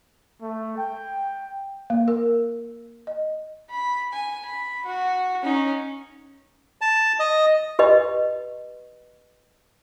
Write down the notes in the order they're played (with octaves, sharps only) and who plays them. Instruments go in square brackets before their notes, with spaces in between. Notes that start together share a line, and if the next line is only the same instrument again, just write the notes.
[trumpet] A3
G5
[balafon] A#3
A#4
D#5
[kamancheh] B5
G#5
B5
F#4
C#4 D#4
[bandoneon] A5
D#5
[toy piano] G4 B4 D#5